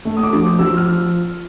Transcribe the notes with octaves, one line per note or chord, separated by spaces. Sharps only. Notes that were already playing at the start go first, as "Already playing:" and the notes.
A3
D#6
D6
F3
F3 E6
F6